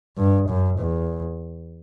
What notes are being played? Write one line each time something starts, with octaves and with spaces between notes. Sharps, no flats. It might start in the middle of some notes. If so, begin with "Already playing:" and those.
G2
F#2
E2